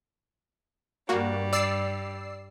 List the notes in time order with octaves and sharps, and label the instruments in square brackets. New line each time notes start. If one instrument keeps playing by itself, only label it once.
[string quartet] G2 G3 [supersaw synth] A#3 F#4
[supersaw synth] D5 E6 C7